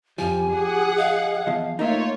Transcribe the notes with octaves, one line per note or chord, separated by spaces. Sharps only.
F2 F3 G4 G#5
G#4 F#5
D#5 F5
E2 F3
A3 A#3 D#4 F4 A#4 C#5 E5